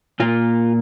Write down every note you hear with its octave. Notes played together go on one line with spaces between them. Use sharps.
A#2 A#3 F4